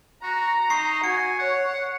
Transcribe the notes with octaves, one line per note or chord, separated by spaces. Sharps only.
F#4 A#5
D#4 C#6 C7
F#4 G#5 C#7
C#5 F#5